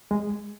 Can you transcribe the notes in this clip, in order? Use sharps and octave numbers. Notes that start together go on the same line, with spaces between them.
G#3